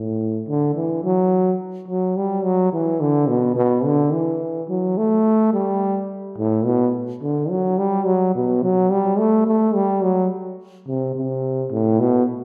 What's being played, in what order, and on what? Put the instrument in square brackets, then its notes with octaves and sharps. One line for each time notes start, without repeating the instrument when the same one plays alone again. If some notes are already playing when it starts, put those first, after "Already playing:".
Already playing: [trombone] A2
D3
E3
F#3
F#3
G3
F#3
E3
D3
B2
B2
D3
E3
F#3
A3
G3
A2
B2
D3
F#3
G3
F#3
B2
F#3
G3
A3
A3
G3
F#3
C3
C3
A2
B2